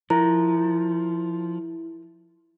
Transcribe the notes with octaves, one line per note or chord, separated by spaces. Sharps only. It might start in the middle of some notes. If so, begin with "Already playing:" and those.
F3 E4 A#4